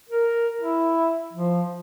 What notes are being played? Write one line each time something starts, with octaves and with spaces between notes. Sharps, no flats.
A#4
E4
F3